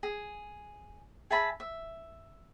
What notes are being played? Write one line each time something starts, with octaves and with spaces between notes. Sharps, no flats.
G#4
G#4 E5 A5 B5
E5